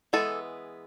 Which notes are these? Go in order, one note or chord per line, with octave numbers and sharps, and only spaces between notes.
E3 G#3 B3 A4